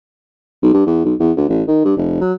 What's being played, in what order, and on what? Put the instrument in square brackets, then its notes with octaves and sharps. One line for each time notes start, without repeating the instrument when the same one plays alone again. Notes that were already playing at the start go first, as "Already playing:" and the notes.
[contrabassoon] B1
G2
E2
B1
E2
D2
A1
D#3
G2
F1
F#3